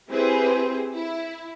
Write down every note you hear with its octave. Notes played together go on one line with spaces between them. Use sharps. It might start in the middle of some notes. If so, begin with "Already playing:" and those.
C4 E4 G4 G#4 B4 C5
E4